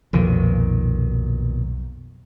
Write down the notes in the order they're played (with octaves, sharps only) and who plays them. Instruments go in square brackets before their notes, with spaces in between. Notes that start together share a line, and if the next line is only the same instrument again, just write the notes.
[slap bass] B1 A#2 D#3 [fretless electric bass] F2